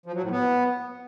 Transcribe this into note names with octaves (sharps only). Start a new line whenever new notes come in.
F3
F#3
A2
B3